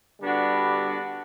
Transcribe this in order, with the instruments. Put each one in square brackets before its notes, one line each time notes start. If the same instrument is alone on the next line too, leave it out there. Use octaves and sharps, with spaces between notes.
[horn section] D3 G3 B3 D4 F#4